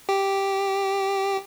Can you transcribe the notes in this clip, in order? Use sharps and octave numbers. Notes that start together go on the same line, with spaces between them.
G4